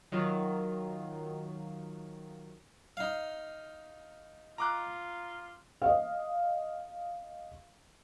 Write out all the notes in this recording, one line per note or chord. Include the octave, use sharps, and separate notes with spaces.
D#3 F#3 F4
D#4 F5
F4 A#5 D6 F#6
D#5 F5